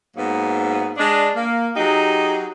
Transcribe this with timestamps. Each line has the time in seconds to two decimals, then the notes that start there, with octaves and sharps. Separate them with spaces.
0.16 G#2 F#3 A#3 B3
0.98 G#3 D4
1.36 A#3
1.76 F#3 D#4 G4 G#4